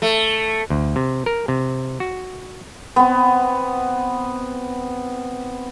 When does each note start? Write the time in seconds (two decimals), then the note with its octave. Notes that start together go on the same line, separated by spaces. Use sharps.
0.02 A3
0.70 D2
0.96 C3
1.26 A#4
1.48 C3
2.00 F#4
2.96 B3 C4